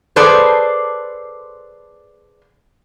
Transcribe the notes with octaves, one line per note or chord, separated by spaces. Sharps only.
G#4 A4 B4 C5 D5